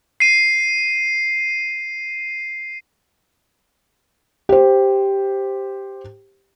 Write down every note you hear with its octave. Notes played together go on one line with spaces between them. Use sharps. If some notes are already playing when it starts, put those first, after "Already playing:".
C7 D#7
G4 C5